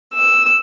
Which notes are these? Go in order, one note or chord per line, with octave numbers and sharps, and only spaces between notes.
E6